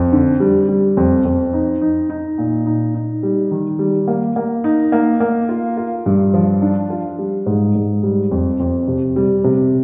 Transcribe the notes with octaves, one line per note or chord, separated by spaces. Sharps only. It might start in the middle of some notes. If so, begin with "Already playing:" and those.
Already playing: F2
D3
G3
G3
F2
F2
D#4
D#4
D#4
A#2
D#4
D#4
G3
D#3
G3
A#3
A#3
D#4
A#3
A#3
F4
F4
G2
F3
D4
F4
G3
G#2
G#2
G3
F2
F2
C3
G3
C3